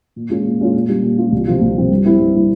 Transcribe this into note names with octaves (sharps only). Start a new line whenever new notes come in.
A#2
G#3 C#4 F4
A#2
G#3 C#4 F4
A#2
G3 C#4 F4
A#2
G3 C#4 F4
C2
C3 F3 C4 F4
C2
C3 F3 C4 F4
G2
G3 C4 E4
G2
G3 C4 E4